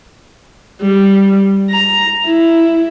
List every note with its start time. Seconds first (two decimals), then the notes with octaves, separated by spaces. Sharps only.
0.81 G3
1.70 A#5
2.25 E4